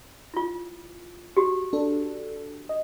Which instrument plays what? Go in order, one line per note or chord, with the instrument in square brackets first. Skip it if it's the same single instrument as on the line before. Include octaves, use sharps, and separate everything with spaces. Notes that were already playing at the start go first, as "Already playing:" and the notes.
[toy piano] E4 F4
F#4 G4
[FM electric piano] D4 A4
D#5